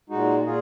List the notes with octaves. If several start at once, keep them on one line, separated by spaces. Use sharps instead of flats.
A#2 G#3 D#4 F#4
A#2 F4 G#4